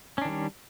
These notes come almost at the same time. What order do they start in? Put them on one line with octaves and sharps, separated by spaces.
C#4 D4 D#3 G3